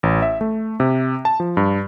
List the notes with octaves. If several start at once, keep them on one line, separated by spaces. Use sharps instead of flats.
A1
E5
A3
C3
A5
F3
G2